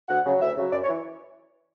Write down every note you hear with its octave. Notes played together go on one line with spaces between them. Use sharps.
D2 F#5
C#3 F#3
D2 E5
C#3 F#3
F#2 D5
C#5
E3